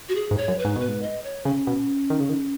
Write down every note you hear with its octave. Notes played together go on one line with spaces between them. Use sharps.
F#4
G#4
G#2
C#5
F#2
B4
G#2
B2 B4
G#2
D#5
C#5
C#3 C#4
B2
D#3
C#3
D#3